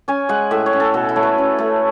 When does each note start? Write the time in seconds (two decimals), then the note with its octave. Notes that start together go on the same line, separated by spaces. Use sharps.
0.08 C#4 G#5
0.29 G#3 F#5
0.51 A2 E5
0.66 C#5
0.73 C#4
0.80 A4
0.94 B2 F#4
1.09 E4
1.16 A3 C#5
1.23 B4
1.38 C#4
1.59 A3